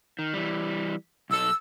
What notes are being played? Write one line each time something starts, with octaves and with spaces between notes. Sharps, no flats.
D#3
E3 G3
B1 A4 E6